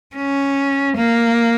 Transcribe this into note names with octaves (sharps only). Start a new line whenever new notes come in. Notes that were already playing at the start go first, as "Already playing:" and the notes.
C#4
A#3